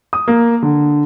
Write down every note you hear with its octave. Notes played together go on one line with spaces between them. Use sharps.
D#6
A#3
D3